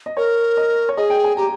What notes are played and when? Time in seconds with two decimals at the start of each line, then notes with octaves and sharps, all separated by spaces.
0.06 D#5
0.17 A#4 C#5
0.57 D#5
0.89 C#5
0.97 G#4 D#5
1.10 G5
1.24 G#5
1.37 G4 A#5